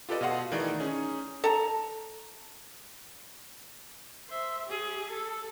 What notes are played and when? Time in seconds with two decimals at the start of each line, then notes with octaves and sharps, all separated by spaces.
0.09 F4 G4 A4 B4 D5 D#5
0.21 B2 D#5 F5 F#5 C6
0.52 D#3 E3 A3 D#4 G#4 D5
0.80 C#4 D#4 G#4
1.44 A4 A#5
4.28 C5 E5
4.65 G4 G#4
5.11 A4